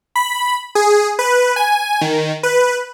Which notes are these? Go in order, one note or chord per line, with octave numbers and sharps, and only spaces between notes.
B5
G#4
B4
G#5
D#3
B4